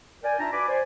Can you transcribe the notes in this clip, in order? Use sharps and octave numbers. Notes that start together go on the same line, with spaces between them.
A#4 D5 G5 G#5
D4 D#4 F4 E5 A5 A#5
F#4 B4 D5 G#5 B5 D6
C5 D5 G#5